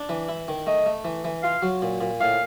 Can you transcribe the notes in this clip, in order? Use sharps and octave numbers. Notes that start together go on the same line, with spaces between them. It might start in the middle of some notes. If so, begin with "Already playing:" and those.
Already playing: D4
E3
E4
D#3
A3 D#5
A3
E3
E3
F4 F5
F#3
A#2
A#2
A2 F5